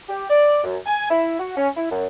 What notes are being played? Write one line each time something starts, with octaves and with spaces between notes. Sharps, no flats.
G4
D5
F#2
G#5
E4
F#4
C#4
E4
F#2